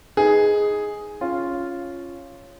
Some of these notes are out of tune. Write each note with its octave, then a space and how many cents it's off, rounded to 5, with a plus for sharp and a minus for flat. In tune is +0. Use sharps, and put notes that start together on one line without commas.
D#4 +15 G#4 +0 B4 +5
C#4 +0 F4 -5